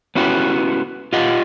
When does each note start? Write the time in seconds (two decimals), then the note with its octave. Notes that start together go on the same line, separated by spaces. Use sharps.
0.15 B3 C#4 E4 F#4 G4
1.13 F4 G4 D#5 F#5